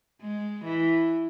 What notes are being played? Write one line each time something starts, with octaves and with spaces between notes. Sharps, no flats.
G#3
E3